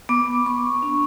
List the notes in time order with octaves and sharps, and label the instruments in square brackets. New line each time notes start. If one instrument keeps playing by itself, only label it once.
[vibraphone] B3 D6
B3 C#6
D4